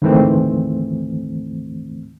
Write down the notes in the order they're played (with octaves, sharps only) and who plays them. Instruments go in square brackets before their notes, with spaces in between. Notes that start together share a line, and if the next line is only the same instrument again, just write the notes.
[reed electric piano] D2 G#2 D#3 E3 A3 C4